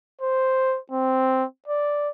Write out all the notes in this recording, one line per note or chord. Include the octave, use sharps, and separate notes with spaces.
C5
C4
D5